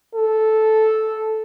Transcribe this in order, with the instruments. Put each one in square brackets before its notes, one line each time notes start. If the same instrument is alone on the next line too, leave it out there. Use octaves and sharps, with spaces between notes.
[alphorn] A4